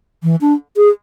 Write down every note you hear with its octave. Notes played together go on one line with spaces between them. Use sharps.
E3
D4
G#4